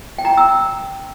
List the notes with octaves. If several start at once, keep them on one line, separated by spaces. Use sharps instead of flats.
G5
A#5
G5
E6